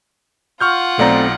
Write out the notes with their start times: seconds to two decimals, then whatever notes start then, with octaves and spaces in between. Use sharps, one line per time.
0.61 F4 F#5 C#6 F6 G6
0.99 B1 A3 C4 D5 A#5